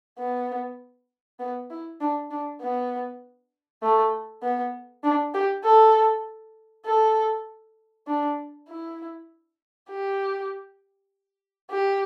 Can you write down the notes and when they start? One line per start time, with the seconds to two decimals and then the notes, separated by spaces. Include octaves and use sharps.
0.19 B3
1.39 B3
1.70 E4
2.00 D4
2.31 D4
2.61 B3
3.83 A3
4.43 B3
5.04 D4
5.34 G4
5.64 A4
6.85 A4
8.07 D4
8.68 E4
9.89 G4
11.71 G4